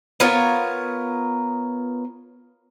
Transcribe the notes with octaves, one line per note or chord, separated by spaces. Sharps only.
B3 F4 A#4 C#5